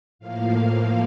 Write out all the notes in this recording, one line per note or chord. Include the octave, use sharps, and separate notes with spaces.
A2 F3 A#3 F5